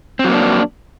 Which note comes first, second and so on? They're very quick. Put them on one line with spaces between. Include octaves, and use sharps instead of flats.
C4 F#3 A#3 D4